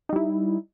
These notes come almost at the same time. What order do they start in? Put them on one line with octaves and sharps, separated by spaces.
D#4 G3 E4